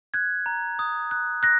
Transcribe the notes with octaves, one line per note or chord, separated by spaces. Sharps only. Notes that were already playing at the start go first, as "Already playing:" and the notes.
F#6 G#6
A#5
D#6
F#6
F#6 A#6